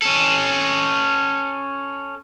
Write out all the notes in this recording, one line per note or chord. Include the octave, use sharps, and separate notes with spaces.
C#4 A4